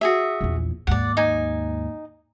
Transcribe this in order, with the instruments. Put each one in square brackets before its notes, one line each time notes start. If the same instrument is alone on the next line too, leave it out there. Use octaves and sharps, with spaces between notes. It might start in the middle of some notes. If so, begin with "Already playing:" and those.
[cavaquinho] F#4 G#4 E5
[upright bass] A#1 E2
[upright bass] D#2 G#2 [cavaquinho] D5 F#5
[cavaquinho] D#4 G#5